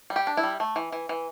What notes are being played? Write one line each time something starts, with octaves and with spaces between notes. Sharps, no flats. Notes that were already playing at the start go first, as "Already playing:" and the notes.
G3
G4
D4
E4
G3
A3
E3
E3
E3